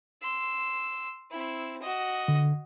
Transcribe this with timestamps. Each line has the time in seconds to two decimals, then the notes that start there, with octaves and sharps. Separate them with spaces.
0.22 C6 E6
1.31 C4 E4
1.82 F#4 D#5
2.28 D3